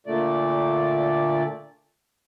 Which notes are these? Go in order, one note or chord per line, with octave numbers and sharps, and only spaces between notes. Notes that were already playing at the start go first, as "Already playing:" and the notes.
A#2 D3 A3 D5